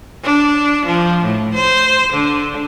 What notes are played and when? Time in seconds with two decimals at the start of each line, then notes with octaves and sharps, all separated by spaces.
0.24 D4
0.86 F3
1.24 A2
1.54 C5
2.13 D3